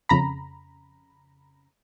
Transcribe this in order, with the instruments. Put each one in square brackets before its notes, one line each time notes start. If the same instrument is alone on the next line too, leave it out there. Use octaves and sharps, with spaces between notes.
[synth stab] F2 C#3 A#5 B5